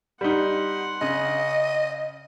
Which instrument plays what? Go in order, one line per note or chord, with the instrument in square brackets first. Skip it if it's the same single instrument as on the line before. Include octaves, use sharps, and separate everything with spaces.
[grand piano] G3 D#4 [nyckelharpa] F#5 C6
[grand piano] C#3 [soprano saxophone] D#5